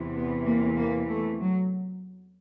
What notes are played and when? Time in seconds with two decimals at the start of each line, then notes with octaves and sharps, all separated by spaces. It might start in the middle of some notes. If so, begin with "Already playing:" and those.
Already playing: E2 C3 E3
0.15 B3
0.45 A#3
0.77 A#3
1.09 A3
1.40 F#3